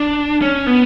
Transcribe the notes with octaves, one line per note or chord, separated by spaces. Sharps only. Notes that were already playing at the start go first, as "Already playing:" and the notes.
Already playing: D4
C#4
B3